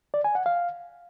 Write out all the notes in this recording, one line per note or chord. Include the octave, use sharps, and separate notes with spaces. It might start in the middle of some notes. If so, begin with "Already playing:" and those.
D5
G#5
F#5
F5